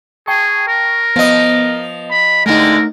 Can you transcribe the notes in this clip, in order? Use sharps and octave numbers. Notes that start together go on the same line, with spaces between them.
G#4 G5 A5 C#6
A#4
F3 B3 D#5
B5
A2 D3 G#3 A3 D#4 A#4